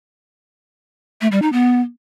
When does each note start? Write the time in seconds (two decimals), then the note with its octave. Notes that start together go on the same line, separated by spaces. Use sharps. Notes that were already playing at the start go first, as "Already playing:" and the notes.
1.21 A3
1.32 G3
1.42 D#4
1.53 B3